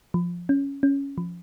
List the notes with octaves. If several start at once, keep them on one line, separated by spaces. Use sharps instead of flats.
F3
C#4
C#4
F3